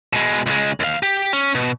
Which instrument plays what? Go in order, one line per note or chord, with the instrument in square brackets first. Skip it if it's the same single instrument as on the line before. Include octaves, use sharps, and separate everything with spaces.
[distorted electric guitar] B2 G#3
C#2 G#3
D#2 F5
G4
C#4
B2